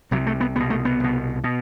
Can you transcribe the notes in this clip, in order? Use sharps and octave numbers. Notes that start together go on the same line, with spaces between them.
C2 C3 F#3
A3
B3
C2 B2 B3
A3
B3
C2 B2
B2